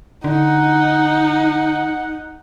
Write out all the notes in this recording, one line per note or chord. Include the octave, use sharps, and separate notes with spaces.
D3 D#4 F#5